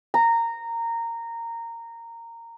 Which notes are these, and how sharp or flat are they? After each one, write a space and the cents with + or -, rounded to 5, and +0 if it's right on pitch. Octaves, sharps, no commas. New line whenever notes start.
A#5 -15